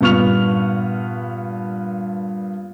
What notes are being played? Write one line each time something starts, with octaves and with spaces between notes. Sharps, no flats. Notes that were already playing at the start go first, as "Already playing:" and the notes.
G2 A#2 B3 C#6 F6 F7